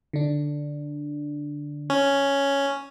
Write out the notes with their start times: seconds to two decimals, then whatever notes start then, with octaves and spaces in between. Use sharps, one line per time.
0.13 D3 D4
1.90 C#4